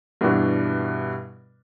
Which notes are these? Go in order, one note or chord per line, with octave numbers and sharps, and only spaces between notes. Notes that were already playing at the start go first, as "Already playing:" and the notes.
G2 B2 E3 D4 E4 F#4